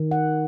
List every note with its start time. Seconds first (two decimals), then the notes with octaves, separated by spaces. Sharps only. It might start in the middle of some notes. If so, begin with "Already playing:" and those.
Already playing: D#3
0.11 F#5